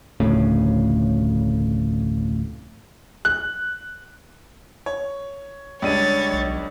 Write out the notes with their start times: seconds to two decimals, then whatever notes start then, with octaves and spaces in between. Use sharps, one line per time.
0.20 F1 D2 A2 C#3
3.25 F#6
4.86 C#5
5.82 C#2 G3 D4 C#5 A6 D#7
6.33 B1